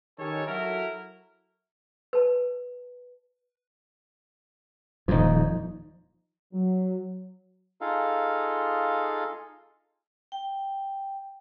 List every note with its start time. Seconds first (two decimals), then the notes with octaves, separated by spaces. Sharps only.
0.19 D#3 C#4 D#4 G4 A4 C#5
0.47 F#3 E4 F#4 A4 A#4
2.13 B4 A5
5.08 D#1 F2 F3 D#4
6.53 F#3
7.81 D#4 F4 G#4 A4 F5
10.32 G5